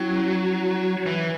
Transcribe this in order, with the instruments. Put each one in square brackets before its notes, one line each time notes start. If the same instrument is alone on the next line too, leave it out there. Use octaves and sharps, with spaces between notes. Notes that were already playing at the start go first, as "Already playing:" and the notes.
Already playing: [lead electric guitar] F#3 [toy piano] C#4 E4 C#5
[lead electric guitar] E3